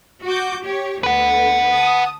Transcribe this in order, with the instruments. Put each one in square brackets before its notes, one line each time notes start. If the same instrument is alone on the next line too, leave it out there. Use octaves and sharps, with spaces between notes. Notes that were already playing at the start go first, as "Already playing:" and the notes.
[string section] F#4 D6 G6
G4 C#5
[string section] D2 D3 B3 [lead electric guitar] B4 F#5
[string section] A5 D#6